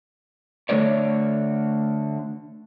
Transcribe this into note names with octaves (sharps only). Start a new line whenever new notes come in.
D3 A3 A4 C#5 D5